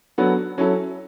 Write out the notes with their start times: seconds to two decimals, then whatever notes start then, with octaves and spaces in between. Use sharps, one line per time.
0.18 F#3 B3 D4 F#4 A4
0.58 F#3 C#4 E4 A4